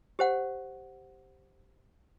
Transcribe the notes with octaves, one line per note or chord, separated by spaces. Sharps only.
G4 C5 F#5